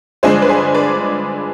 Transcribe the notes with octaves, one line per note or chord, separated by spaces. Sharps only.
G2 D3 F3 G#3 D4 G#4 C5
B4
G#4 C5
B4 D5